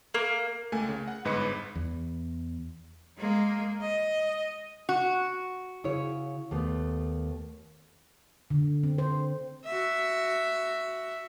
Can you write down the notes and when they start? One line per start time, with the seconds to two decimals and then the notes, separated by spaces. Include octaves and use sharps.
0.14 A#3
0.72 C#2 A3 A#3 G#5
0.89 C#3
1.08 F#5
1.25 G1 G#2 B4 D#5 B5 C#7
1.75 E2
3.17 G#3 A#3
3.81 D#5
4.89 F#4
5.84 C#3 E4 C#5
6.51 D#2 A3 B3
8.51 D3
8.83 C4
8.98 C5
9.65 F#4 E5